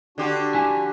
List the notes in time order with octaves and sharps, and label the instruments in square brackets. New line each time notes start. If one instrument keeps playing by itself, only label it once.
[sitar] D3 G4 [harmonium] D4 F#4
[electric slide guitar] E4 G#5